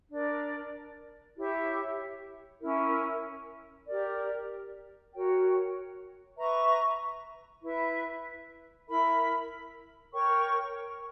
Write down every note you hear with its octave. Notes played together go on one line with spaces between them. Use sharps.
D4 A#4 D5
E4 G4 C#5 E5
C#4 E4 A#4
G4 A#4 D5
F#4 A#4 C#5 G5
B4 E5 A#5 C#6
E4 B4 E5
E4 A#4 E5 B5
A#4 C#5 G5 C#6